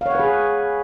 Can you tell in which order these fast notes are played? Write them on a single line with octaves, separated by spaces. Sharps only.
F5 C#5 F#5 B4 G#4